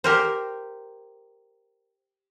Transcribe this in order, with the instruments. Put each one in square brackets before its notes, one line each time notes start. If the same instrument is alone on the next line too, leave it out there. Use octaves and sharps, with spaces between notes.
[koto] G4 A#4 C5